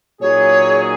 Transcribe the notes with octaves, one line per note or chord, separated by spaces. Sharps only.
A#2 F#3 D#4 G#4 C#5